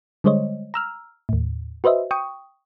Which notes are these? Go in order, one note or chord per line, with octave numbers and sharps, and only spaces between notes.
D3 G3 G#3 C5 C#5 D#5
A#5 E6 F6
D#2 A2
F#4 B4 C5 D#5 E5
G5 C#6 D#6